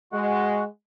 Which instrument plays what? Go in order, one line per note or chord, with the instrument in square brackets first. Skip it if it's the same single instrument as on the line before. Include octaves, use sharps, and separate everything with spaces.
[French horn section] G#3 [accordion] F#4 F#5